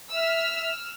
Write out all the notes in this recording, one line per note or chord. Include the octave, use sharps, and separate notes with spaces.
E5 E6 F6